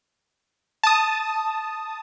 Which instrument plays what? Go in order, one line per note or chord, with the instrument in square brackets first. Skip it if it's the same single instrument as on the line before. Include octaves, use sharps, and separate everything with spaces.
[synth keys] A5 D#6